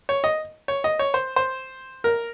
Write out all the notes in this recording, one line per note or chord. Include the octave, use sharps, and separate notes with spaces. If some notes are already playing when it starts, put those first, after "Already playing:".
C#5
D#5
C#5
D#5
C#5
C5
C5
A#4